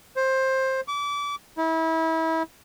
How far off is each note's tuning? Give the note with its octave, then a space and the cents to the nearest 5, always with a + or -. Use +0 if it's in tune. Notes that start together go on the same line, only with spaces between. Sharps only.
C5 +15
D6 -30
E4 -30